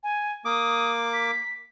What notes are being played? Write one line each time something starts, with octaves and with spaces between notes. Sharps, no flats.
G#5
A#3 D6 D#6
B6